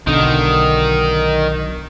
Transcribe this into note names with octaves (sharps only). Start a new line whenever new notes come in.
B1 D3 D#3